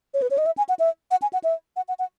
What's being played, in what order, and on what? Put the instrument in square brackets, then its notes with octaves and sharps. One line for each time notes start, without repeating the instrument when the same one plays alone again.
[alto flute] C#5
B4
C#5
D#5
E5
G#5
F#5
E5
F#5
G#5
F#5
E5
F#5
F#5
F#5